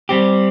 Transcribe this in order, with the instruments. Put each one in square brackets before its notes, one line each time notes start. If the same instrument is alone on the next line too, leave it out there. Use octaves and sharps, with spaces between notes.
[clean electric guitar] G3 C4 G4